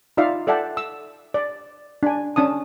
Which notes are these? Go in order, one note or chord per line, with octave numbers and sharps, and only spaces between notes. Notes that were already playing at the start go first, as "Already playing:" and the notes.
D#4 F4 D5 E5 F5
A4 D5 E5 F#5 G5 A5
E6
D5
D4 G#5
C#4 D4 A5 D#6